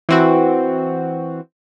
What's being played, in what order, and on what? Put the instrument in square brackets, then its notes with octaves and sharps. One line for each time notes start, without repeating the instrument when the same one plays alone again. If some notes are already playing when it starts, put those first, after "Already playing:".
[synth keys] E3 C4 F#4